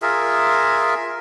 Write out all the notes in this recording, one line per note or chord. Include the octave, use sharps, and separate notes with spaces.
F4 G#4 A#4 E5